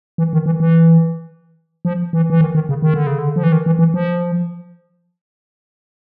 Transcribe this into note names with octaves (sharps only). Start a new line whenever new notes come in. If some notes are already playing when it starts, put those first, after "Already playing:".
E3
D#3
E3
E3
F3
E3
E3
D#3
D#3
C#3
D#3
D3
C#3
D3
F3
E3
D#3
E3
E3
F3